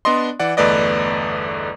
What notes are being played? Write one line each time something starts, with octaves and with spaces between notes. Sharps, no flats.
B3 D4 D5 D#5 C6
E3 D5 F#5
G1 E2 A3 B4 D5 D#5